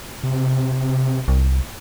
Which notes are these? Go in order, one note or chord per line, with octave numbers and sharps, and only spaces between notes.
C3
C2